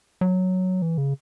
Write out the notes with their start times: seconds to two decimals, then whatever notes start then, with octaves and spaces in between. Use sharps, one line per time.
0.21 F#3
0.82 E3
0.98 C#3